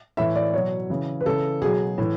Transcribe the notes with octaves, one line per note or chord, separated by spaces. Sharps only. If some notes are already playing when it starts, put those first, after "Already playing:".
A2 E3 E5
D5
B2 F#3 C#5
C#3 E3
B4
C#3 E3 A4
B2 F#3 G#4
A2 E3